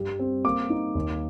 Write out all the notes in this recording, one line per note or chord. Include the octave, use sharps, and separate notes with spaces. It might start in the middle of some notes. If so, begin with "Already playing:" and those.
Already playing: G2 G3
C4
A#3 D6
D#4
D#2